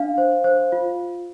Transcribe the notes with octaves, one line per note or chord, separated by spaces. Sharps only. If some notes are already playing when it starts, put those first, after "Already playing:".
Already playing: D4 F5
C5
C5
F4